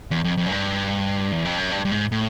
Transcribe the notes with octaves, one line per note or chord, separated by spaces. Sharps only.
E2
F2
F2
F#2
G2
E2
F2
F#2
G2
G2
G#2
A2